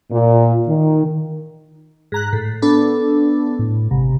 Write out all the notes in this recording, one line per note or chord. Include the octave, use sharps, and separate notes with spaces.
A#2
D#3
G#2 A#5 F#6
A2
B3 D4 A4
A2
G#1 C3